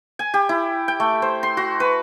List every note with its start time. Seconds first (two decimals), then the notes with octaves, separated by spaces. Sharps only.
0.19 G#5
0.34 G4
0.49 E4
0.88 G5
1.00 A3
1.22 C5
1.43 C6
1.57 F#4
1.80 B4